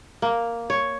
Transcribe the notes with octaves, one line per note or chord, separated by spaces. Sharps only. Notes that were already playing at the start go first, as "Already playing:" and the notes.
A#3
C#5